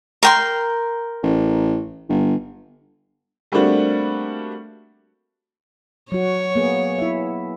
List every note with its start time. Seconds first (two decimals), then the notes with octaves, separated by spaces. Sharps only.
0.23 A#4 G5 C6
1.23 A1
2.09 G1
3.52 G3 A3 A#3 C4 D4 F#4
6.12 F#3 F#4 C#5
6.55 A#3 B3 G#4
6.99 E4 E5